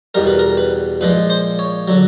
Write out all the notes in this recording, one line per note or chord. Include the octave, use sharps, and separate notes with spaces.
E2 B2 G3 A#4
B4
A#4
B4
A#2 F3 G#3 B4
C5
C#5
D3 F#3